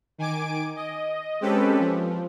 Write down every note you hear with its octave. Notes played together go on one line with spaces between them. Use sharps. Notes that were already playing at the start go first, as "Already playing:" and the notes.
D#3 G#5 D6 D7
D#5
G#3 C4 C#4 G4 A4 B4
F3